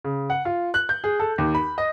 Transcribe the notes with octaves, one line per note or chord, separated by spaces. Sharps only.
C#3
F#5
F4
F#6
G6
G#4
A4
D#2
B5
D#5